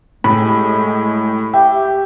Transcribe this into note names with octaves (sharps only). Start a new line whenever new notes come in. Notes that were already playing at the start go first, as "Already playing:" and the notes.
A2 G#3 G4 B5
G4 E5 G5